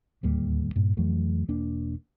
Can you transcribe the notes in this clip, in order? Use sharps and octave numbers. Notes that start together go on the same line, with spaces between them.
D1 D#2 G3 A#3
G2 A#2
F2 E3 F#3 A3
E1 A#3 D4